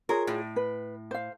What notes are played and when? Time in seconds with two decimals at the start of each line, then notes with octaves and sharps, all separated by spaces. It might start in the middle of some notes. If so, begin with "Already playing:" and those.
0.09 F4 G#4 A#4 C#5
0.27 A2
0.56 B4
1.11 C5 F5